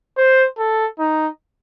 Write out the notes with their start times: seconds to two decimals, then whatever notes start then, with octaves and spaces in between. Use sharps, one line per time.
0.17 C5
0.58 A4
0.99 D#4